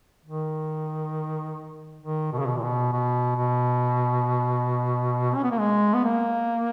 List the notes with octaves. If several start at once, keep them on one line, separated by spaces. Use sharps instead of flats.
D#3
D#3
B2
C#3
B2
A#2
B2
B2
B2
C#4
B3
A#3
G#3
B3
A#3